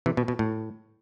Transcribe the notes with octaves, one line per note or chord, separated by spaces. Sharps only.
C3 E3
B2
B2
A2